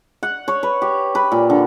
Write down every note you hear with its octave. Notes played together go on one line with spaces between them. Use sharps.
F#5
C#5
B4
G4
B4
A#2
D3